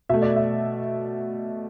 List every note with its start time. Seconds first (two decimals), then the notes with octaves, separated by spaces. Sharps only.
0.09 B2 A3 E5
0.22 D5
0.36 E5